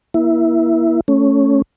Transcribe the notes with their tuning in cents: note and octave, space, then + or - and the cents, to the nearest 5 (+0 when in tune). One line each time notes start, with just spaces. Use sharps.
A#3 +30 E4 +0
A3 +0 C#4 +0